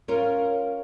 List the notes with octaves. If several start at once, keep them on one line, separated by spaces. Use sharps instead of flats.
C#4 F4 A#4